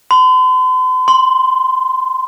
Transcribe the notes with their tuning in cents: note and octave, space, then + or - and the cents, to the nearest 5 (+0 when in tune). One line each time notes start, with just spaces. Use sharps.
C6 -45
C6 -5